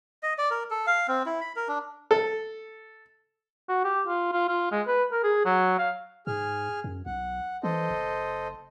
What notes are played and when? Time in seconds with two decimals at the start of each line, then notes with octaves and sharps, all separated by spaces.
0.23 D#5
0.38 D5
0.51 A#4
0.70 A4
0.87 F5
1.08 C4
1.26 E4
1.41 B5
1.56 A#4
1.68 D4
2.11 A4
3.69 F#4
3.84 G4
4.08 F4
4.32 F4
4.49 F4
4.72 G#3
4.87 B4
5.12 A#4
5.24 G#4
5.45 F#3
5.79 F5
6.27 G#2 G#4 F6
6.84 F#2
7.06 B1 F#5
7.63 E3 A4 C5 D#5
7.90 F#1